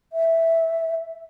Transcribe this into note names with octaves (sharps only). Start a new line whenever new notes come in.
E5